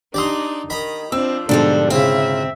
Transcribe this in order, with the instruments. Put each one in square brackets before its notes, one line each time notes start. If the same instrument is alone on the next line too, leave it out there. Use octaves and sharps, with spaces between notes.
[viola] D4 D#4 [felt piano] G4 D#6 [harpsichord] D5 A#5 C6
[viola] D#3 [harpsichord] D#5 A#5 B5
[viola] F3 D4 [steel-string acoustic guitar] C4 [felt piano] E6
[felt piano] G#2 B2 D3 [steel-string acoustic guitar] F3 G3 D4 [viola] A4
[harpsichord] C#3 E4 F4 [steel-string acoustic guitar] C4 [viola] E5